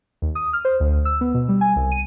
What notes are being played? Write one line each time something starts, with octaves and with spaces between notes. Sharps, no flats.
D#2
D#6
F6
C5
D2
E6
B3
B2
G3
G#5
C2
D#7